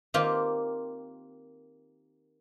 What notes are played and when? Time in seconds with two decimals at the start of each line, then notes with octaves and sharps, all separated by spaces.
0.14 D#3 A#3 C4 F4 G4